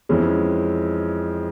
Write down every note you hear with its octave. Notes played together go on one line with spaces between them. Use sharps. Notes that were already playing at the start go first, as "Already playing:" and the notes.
F2 E3 G#3 C#4